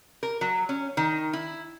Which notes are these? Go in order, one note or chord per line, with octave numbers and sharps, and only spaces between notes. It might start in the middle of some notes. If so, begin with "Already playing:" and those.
A#4
F#3
C#4
D#3
E4